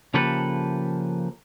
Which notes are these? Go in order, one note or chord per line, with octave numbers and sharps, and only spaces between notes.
C#3 F3 A#3 G4 A4 B4